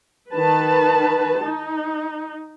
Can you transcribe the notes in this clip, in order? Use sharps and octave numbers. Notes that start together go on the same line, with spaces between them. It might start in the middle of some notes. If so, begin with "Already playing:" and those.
D#3 B4 A5
D#4